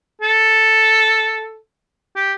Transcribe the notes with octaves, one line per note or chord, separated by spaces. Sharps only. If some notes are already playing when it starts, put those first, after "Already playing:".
A4
G4